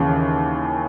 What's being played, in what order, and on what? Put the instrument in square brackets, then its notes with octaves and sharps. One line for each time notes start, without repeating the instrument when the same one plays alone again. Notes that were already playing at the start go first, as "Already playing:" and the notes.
Already playing: [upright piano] D#2 C#3 E3